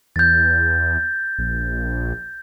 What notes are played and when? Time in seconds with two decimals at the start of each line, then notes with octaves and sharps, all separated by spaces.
0.16 E2 G6 A6
1.39 A#1